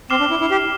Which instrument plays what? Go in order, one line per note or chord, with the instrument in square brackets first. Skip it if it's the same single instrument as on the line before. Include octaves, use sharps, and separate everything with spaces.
[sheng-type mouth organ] C4 [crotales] D6 F6 C7 E7 G7
[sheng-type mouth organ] D4
E4
E4
G4